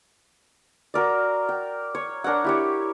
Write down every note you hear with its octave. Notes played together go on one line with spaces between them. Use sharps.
F#4 A#4 D5
G5
C#5
D4 A#4 C#5 F#5
E4 G4 C#5